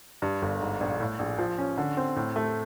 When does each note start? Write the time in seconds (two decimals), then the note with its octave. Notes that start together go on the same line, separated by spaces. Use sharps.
0.22 G2
0.42 G1
0.61 G#2
0.81 A#1
1.00 A2
1.19 A#1
1.38 F3
1.58 C#4
1.78 D3
1.97 C4
2.16 A2
2.36 A3